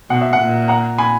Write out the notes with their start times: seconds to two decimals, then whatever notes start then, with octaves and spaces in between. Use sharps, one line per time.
0.10 B2 F#5
0.21 E5
0.33 F#5
0.39 A#2
0.68 F#5 A#5
0.98 G#5 B5